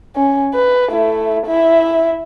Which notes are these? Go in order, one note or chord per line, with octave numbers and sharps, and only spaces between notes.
C#4
B4
A3 E4
E4 E5